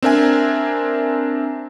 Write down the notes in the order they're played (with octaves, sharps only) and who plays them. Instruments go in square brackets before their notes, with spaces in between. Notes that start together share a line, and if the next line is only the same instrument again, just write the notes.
[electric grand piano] C4 D4 A#4 E5 G#5